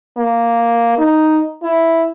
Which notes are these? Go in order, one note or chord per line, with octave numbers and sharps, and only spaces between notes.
A#3
D#4
E4